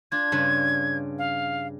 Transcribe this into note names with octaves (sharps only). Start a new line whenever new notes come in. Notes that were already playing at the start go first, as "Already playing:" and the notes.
D4 F4 G#6
G2 C#3 B4
F5